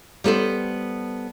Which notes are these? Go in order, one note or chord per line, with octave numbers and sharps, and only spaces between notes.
G3 B3 A4 C5